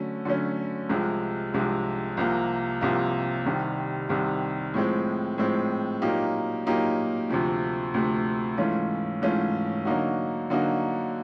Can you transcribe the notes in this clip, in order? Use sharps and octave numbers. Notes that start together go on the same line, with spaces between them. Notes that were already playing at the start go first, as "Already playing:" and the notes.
Already playing: D3 F#3 A3 C#4
D3 F#3 A3 C#4
C2 C3 F3 G#3
C2 C3 F3 G#3
C2 C3 F3 A#3
C2 C3 F3 A#3
C2 C3 D#3 G3
C2 C3 D#3 G3
A2 F3 G#3 C4
A2 F3 G#3 C4
A#2 F#3 A#3 D#4 G4
A#2 F#3 A#3 D#4 G4
D2 C3 F3 A3
D2 C3 F3 A3
G#2 E3 A3 C#4 F4
G#2 E3 A3 C#4 F4
D3 F#3 A#3 D#4 F#4
D3 F#3 A#3 D#4 F#4